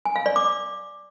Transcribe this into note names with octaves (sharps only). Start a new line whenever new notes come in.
G#5
F5
D5
D6